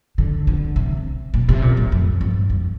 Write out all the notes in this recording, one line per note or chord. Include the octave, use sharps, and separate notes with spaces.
D3
D3
C3
A#2
C3
A#2
A2
F2
G2
F2